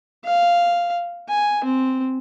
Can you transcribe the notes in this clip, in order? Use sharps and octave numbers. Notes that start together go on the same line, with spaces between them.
F5
G#5
C4